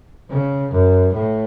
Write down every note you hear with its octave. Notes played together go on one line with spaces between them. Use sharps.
C#3
F#2
A2